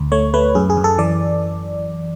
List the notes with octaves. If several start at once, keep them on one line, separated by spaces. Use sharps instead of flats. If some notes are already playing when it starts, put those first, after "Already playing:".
Already playing: D2
A3 C#5
A3 B4
F#2 G#4
G#4
F#2
A4
E3 D5